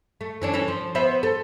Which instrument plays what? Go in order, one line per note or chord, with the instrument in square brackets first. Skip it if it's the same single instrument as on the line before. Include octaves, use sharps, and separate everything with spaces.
[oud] A3
E3 C#4 D4
E3 C#4 A4
F3
B3 C5 E5
A4